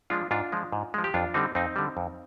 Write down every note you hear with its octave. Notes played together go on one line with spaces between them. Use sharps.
F3 G#3 D4 F4
G#2 D4 F4
F3 G#3
G#2
F3 G#3
G4
F2 D4 F4
D3 G3 C4 D#4
F2 C4 D#4
D3 G3
F2